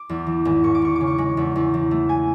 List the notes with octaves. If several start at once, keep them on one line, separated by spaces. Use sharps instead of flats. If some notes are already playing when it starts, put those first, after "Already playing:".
Already playing: D6
E2
E3
G#1
G#1 C#6
D6
G#1 C#6
C#3 D6
C#6
G#3
E2
E2
E3
A3
G#5